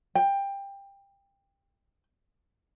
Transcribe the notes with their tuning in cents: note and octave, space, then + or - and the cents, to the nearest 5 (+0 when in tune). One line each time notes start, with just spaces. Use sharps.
G5 +20